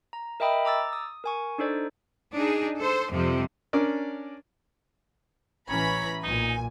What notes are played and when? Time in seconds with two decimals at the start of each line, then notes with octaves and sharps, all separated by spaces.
0.13 A#5
0.40 A#4 D#5 E5 G5 B5 D#6
0.65 A#5 D6 E6 A6
0.93 D#6
1.24 A#4 G#5 C#6
1.58 D4 D#4 A4 C5 D5
2.33 D4 D#4 G#4
2.78 A4 C5
3.11 F2 C3 F3 G3
3.73 C#4 D4 A#4 D5
5.69 A1 E3 C#4 C#5 A#5 B5
6.24 B1 A#2 D#4 G#5